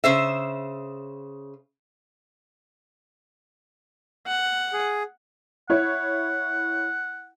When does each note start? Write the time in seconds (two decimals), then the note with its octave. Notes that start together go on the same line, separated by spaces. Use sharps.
0.04 C#3 C5 E5
4.27 F#5
4.73 G#4
5.70 E4 C#5 F#5